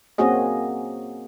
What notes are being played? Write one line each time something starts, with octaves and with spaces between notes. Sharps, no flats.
A#3 C4 C#4 F#4 G#4 D#5